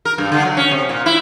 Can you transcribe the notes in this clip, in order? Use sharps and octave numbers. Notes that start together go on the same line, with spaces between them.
A#4
G2
D3
F#3
C#4
C3
A#2
E4